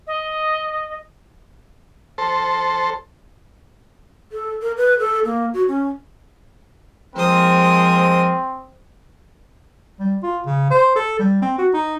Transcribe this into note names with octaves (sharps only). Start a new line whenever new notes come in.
D#5
A4 C5
A4
A#4
B4
A4
A#3
F#4
C#4
F3 G#3 C4 A#4 C5 D#6
G3
F4
C#3
C5
A4
G3
C4
F#4
D#4